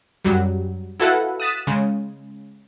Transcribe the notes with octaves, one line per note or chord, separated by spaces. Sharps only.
F#2 F#3 G3
E4 F#4 A4 B4 F5 F#5
D#6 F#6 A6 B6 E7
C#3 G#3